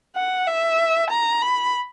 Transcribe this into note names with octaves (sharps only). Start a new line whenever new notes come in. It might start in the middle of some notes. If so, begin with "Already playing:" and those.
F#5
E5
A#5
B5